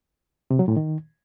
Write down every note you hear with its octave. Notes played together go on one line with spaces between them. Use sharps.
C3
F#3
A2
D#3